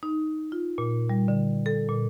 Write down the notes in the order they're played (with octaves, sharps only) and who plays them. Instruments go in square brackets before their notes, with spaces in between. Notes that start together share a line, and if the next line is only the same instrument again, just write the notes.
[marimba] D#4
F4
A#2
G3
D3
A4
A#2